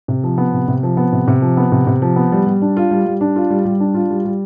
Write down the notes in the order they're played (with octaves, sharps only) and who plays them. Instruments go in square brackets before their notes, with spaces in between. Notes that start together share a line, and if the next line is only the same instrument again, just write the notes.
[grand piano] C3
F3
B3
C3
C3
F3
B3
C3
C3
F3
B3
C3
C3
F3
B3
G3
G3
D4
F4
G3
G3
D4
F4
G3
G3
D4
F4
G3
G3